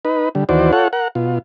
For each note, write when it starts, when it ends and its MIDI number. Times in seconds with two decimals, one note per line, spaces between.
0.05 0.29 63
0.05 0.29 71
0.35 0.44 50
0.35 0.44 55
0.49 0.72 39
0.49 0.72 52
0.49 0.72 66
0.49 0.72 72
0.49 0.72 74
0.73 0.88 65
0.73 0.88 69
0.73 0.88 73
0.73 0.88 78
0.93 1.08 70
0.93 1.08 78
1.15 1.39 47
1.15 1.39 65